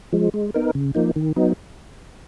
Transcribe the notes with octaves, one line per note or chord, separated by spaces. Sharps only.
F3 G#3
G#3
B3 D#4 A#4
C#3
F3 A#3 D#4
D#3
F#3 B3 D#4